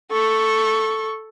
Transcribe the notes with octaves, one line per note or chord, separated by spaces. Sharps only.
A4 C#6